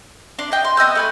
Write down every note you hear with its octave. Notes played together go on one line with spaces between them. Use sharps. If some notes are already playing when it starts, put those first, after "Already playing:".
D4 C6
D#5 G5
C6
B3 D#5 E6 G6
A3 B4 G#5